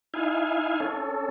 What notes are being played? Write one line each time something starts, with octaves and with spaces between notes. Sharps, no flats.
D#4 E4 F5 G#5
C#4 A4